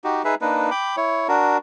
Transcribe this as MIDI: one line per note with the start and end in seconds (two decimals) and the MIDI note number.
0.04 0.22 63
0.04 0.22 66
0.04 0.22 67
0.25 0.35 63
0.25 0.35 68
0.25 0.35 71
0.25 0.35 76
0.41 0.70 58
0.41 0.70 62
0.41 0.70 63
0.41 0.70 71
0.71 0.96 79
0.71 0.96 83
0.71 0.96 86
0.97 1.27 64
0.97 1.27 73
1.28 1.58 62
1.28 1.58 66
1.28 1.58 70